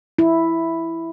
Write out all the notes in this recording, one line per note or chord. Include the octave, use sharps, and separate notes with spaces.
E4